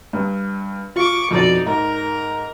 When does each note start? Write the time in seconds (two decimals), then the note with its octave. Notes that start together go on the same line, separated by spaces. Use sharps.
0.13 G2
0.96 F4 C#6 D6
1.31 F2 B2 D#4 D5
1.66 G#2 A#4 A#5